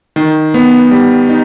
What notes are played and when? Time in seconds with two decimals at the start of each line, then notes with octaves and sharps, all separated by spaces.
0.16 D#3
0.54 B3
0.91 G3
1.29 D#4